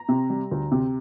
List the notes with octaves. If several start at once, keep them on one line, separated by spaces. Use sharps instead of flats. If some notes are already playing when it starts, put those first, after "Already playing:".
Already playing: A#5
C3
G3
D2
C3